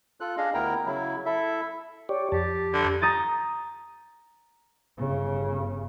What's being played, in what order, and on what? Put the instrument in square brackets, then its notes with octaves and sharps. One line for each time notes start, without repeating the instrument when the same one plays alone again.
[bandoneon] F4 A4 F#6
D4 G#4 D#5 F5
D2 B3 E4 A#4 G5 A#5
C#3 F#3 E4
E4 A4 E5
[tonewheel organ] G4 C#5 D5
[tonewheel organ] F2 A5 [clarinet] G4
[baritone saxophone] D3
[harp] A#5 D#6 G6 A6
[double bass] G1 C#3